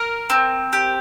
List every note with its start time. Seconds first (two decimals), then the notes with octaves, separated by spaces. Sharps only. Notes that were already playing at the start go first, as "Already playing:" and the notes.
Already playing: A#4
0.30 C4
0.73 G4